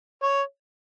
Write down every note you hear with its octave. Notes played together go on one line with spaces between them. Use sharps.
C#5